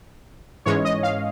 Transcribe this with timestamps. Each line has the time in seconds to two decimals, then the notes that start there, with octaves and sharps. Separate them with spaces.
0.66 G#2 E3 G#3 C#4 C#5
0.85 D#5
1.03 F5